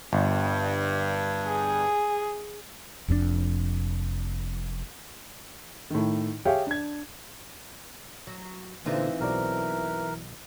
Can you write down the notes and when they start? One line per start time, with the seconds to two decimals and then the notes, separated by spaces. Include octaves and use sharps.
0.13 G1 G2
1.46 G#4
3.08 F1 F2 A2 D4
5.90 A2 D#3
6.45 G4 G#4 C#5 E5 F5 G5
6.67 D4 G#6
8.27 F#3
8.86 A#2 D3 E3 C4 D#4 F4
9.20 B1 F#4 A#4 D5